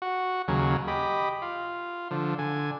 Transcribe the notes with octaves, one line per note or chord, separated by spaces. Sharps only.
F#4
D#2 C#3 F#3
G4 D#5 B5
F4
D3 F3
D3 G#5